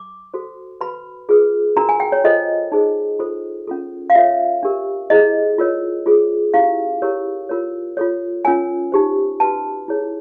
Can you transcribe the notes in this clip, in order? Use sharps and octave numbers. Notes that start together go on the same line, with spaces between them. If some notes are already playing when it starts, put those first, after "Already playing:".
Already playing: D6
F#4 A4 C5
F#4 B4 B5
F4 G#4 B4
D4 F#4 A#4 A#5
G#5
G5
C#5
F4 A4 C5 D#5
D#4 G#4 C5
F4 A4 C5
C#4 F4 A4
F5
F4 A4 C#5 E5
D4 G4 A#4
E4 G#4 C5 D#5
F4 A#4 C#5
F4 G#4 C5
C#4 E4 G4 C5 F5
E4 G4 A#4 C#5
F4 A#4 C#5
F4 A4 C#5
C#4 F4 A#4 C#5 G#5
D#4 G4 C5
F#4 B4 A5
E4 G#4 C#5